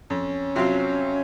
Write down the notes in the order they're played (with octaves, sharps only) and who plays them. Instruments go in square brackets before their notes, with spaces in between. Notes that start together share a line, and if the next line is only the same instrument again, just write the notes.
[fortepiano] F2 [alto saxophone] C#4
[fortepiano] C3 F#3 C4 F4